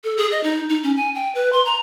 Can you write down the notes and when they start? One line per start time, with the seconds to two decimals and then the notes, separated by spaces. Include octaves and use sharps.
0.04 A4
0.17 G#4
0.32 D#5
0.43 D#4
0.69 D#4
0.83 C#4
0.96 G#5
1.15 G5
1.35 B4
1.53 C6
1.65 A#5